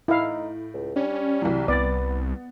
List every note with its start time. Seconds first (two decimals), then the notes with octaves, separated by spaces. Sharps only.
0.08 A2 D#4 E4 F5
0.74 C#2
0.96 G3 C#4 D4
1.42 C2 E3 F#3
1.68 C2 B3 B4 D5 A6